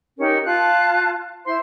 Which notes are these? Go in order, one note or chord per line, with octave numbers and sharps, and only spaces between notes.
C#4 D#4 G4 A#4
F4 F5 A5 F#6
E4 C5 C6